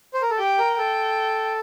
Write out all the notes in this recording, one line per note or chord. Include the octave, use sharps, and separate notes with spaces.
C5
A#4
A4
G4 G5
A#4
A4 G5